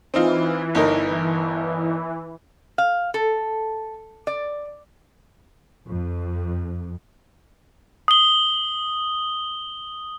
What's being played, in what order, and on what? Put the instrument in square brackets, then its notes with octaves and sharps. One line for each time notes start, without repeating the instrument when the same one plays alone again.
[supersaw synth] E3 [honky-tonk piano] C4 D#4 F4
[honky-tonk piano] G1 D#4 A#4
[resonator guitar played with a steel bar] F5
A4
D5
[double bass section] F2
[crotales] D#6 G7